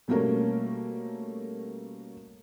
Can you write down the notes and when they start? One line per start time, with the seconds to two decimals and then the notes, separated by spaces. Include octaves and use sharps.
0.08 B2 G3 A3 A#3 C#4 A#4